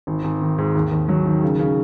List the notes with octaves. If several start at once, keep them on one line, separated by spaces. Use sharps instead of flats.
G#1
G#1
D#3
G#2
D#2
D#2
F#3
D#3
C#3
C#3